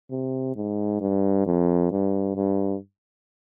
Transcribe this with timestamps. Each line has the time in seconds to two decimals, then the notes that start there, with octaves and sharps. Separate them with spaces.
0.11 C3
0.56 G#2
1.01 G2
1.46 F2
1.91 G2
2.36 G2